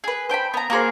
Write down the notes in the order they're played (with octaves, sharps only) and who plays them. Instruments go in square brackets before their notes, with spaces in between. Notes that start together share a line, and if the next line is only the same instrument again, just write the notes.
[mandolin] G#4 B4
C5 G5 G#5 B5
B3 A#5
A#3 F#4 G#4 C5